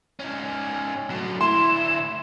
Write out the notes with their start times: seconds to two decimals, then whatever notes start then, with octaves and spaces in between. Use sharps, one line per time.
0.20 C#4 D#4
1.10 F#3 A3
1.41 D2 E4 C6 E7